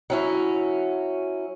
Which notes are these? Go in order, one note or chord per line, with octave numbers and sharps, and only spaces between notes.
F#3 C#4 E4